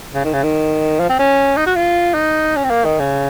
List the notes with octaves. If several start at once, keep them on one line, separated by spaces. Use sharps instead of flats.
C#3
D#3
C#3
D#3
F3
C4
C#4
D#4
F#4
F4
D#4
C#4
C4
A#3
D#3
C#3